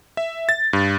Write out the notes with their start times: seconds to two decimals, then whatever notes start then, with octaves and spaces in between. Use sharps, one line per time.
0.17 E5
0.49 A6
0.73 G2